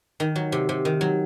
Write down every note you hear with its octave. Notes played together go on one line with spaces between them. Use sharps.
D#3
F#3
C3
C3
D#3
F#3